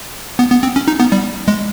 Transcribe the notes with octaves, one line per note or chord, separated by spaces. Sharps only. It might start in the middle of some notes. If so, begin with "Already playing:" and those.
B3
B3
C4
C#4
D#4
B3
G3
G#3